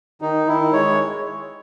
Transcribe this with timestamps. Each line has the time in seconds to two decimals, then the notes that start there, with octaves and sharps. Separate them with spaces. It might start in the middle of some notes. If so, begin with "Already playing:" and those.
0.21 D#3 D#4
0.47 D#3 E4
0.73 G#3 C#5